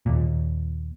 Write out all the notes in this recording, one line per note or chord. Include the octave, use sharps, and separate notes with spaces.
D#2 A#2